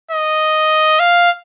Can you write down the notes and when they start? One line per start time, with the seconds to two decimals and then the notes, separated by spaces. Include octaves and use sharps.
0.11 D#5
0.99 F5